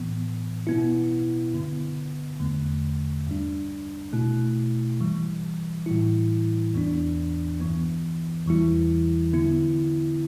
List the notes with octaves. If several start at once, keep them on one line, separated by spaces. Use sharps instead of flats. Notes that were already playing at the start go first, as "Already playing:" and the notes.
Already playing: A2 E3 B3
B2 B3 E4
G2 D3 B3
E2 D3 A3
G2 G3 D4
B2 A3 E4
G2 E3 G3
A2 E3 G3 E4
E2 E3 B3 D4
G2 E3 B3
E2 E3 G3 E4
D3 B3 E4